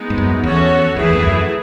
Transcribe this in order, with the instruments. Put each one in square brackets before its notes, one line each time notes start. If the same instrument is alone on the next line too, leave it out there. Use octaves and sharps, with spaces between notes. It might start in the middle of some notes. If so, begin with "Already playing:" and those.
Already playing: [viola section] G#3 B3 D#4
[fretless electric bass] G#2
F#2
[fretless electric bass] E2 [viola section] C#4 F#4 A4 C#5
[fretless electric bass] E2 [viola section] E3 A3 E4 G#4 B4
[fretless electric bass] E2
F#2